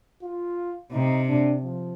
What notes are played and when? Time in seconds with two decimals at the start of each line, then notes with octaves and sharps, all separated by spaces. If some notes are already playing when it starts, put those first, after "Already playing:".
0.23 F4
0.93 C3 D#4
1.28 D4
1.63 F3